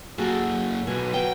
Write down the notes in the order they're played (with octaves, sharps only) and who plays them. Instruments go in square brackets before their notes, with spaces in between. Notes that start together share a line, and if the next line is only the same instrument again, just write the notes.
[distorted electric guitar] F#2 A#3 [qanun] F#4 G#4 A4
[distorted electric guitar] B1 [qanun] B2 G#5
[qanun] F#3 B3 [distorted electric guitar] G5